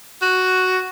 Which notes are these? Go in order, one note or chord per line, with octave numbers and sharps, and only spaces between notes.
F#4